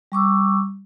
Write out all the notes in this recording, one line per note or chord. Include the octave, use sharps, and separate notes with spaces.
G3 C#6 D6 E6